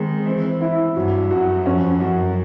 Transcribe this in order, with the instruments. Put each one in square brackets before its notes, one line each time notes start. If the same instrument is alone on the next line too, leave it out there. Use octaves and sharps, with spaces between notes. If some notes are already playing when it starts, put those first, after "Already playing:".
Already playing: [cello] D#3 [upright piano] G#3 C4
[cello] E3 [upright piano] C4
[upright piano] E4
[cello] G2 [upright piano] F#3
[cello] F#2 [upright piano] F#4
[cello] F2 [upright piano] C#4
[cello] F#2 [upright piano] F#4